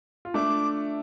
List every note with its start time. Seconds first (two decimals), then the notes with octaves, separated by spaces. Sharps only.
0.25 F4
0.34 A3 D4 D6